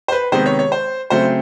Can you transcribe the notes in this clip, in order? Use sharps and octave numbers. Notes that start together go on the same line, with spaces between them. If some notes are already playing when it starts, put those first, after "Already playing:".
C5
B4
C3 D#3 G#3 B3 C5
C#5
C#5
C5
C#3 F#3 A3 C4 C5